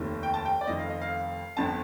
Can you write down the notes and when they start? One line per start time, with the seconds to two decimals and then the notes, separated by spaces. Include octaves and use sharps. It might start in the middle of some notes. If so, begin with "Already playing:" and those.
Already playing: F1 D#2 D#3
0.23 G5
0.34 A5
0.45 G5
0.61 D5
0.67 F1 F2 D#3 D#5
0.79 F5
0.90 D#5
1.01 F5
1.57 G1 F2 D3 A5